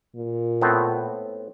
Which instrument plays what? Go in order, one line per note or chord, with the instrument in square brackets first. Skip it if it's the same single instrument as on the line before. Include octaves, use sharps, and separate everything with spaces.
[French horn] A#2
[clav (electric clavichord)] A2 B3 C4